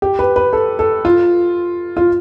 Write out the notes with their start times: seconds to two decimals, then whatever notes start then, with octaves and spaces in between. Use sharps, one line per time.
0.02 G4
0.19 B4
0.36 B4
0.53 A4
0.79 A4
1.05 F4
1.97 F4